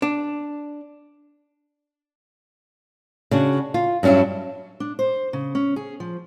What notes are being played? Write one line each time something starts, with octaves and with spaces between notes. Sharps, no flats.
D4
C#3 D4 F#4
F4
G2 F#3 C#4 D4 E4
D4
C5
C#3
C#4
G#4
F3